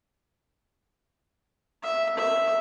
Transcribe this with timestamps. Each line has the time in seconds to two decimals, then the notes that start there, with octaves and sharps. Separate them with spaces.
1.83 E5
2.17 E5